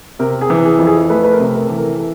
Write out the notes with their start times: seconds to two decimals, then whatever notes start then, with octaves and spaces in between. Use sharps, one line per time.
0.19 C3 A#4
0.41 G#4
0.50 E3
0.65 G#4
0.79 F2
0.87 G#4
1.10 A3 B4
1.24 B4
1.33 A#4
1.40 C3
1.54 A#4
1.66 E3 A4
1.77 A#4
1.99 A4